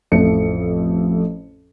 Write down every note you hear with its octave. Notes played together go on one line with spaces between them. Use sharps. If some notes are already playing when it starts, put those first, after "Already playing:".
A1 F2 F3 A3 C#7